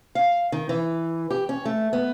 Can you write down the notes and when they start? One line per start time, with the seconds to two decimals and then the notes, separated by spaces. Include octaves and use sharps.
0.15 F5
0.52 D#3
0.69 E3
1.31 G4
1.49 C#4
1.65 A3
1.93 B3